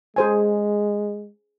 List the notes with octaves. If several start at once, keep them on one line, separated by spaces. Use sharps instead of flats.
G#3 G#4 C5 G#5